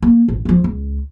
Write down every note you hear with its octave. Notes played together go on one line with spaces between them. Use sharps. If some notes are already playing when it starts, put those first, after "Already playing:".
A#3
A1
C#2 F3
C#2